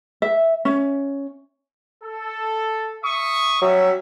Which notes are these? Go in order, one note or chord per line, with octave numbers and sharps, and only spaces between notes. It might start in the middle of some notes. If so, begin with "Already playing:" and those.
E5
C#4
A4
E5 C#6 D#6
F#3 G3 C#4 E5